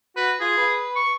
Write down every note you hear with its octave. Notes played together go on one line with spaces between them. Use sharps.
F#4 B4
F4 G#4
B4
C#6